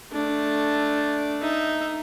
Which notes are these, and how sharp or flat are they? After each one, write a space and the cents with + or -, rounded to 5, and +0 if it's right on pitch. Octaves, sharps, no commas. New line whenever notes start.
A3 +0 D4 +0
D#4 +0 E5 +0